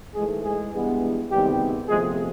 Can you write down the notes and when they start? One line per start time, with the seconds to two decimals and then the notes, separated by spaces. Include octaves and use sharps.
0.15 G#2 E3 G#3 A3 G#4
0.43 G#3 G#4
0.73 G2 E3 G#3 B3
1.30 D2 C3 D#3 G3 G#3 B3 G4
1.87 E2 C3 F3 G#3 A3 G#4